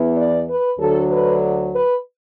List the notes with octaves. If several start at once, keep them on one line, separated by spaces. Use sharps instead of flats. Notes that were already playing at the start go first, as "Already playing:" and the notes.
Already playing: E2 E3 B3
D5
B4
D2 D3 F#3 A4
B4
B4